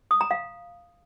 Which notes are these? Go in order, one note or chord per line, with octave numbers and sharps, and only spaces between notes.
D#6
A#5
F5